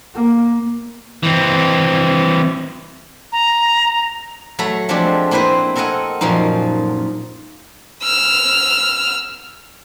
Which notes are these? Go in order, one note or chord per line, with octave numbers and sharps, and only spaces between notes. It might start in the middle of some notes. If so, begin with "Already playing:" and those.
A#3
E3 C4
A#5
F#3 A3 A4 A#5 B5
F3 G#3 A3 C4 D4 G4
A#3 C4 E4 B4 C5
C4 A4 A#4 D#5 F#5 G#5
F#2 A#2 F3 A#3 D#4
E6 F6